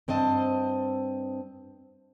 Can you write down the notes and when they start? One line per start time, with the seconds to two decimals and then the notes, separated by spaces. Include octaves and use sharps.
0.08 G2 C4 C5 D#5 A5